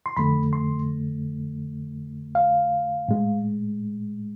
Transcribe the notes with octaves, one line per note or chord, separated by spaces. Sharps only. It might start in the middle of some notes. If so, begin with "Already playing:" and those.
C6
F2 D3 A3 B5
C6
F5
A2 G#3